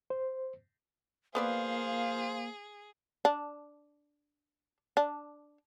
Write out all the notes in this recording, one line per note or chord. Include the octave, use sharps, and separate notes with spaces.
C5
A#3 B3 G#4 B4 C5 D5 F5
D4
D4